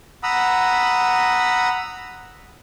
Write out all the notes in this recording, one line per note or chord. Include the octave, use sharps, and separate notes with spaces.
F#5 A#5 B5 D#6 E6